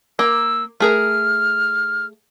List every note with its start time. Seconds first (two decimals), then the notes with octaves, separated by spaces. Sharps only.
0.19 A#3 E6
0.80 A3 G#4 A#4 F6